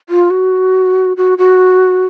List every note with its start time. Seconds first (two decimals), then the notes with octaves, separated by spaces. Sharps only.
0.09 F4
0.30 F#4
1.17 F#4
1.38 F#4